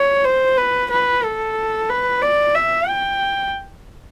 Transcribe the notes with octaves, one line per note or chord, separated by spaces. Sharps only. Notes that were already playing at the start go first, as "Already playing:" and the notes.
Already playing: C#5
C5
B4
B4
A4
B4
D5
E5
G5